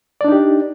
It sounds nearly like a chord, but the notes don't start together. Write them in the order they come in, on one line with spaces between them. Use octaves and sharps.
D5 D4 D#4 G4